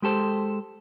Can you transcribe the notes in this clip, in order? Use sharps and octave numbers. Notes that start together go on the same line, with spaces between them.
G#3 G4 A4 C5